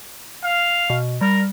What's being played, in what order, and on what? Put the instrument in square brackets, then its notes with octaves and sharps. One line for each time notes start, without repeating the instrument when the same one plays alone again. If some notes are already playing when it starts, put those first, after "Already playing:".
[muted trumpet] F5
[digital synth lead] B2
[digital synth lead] G3 [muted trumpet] A#4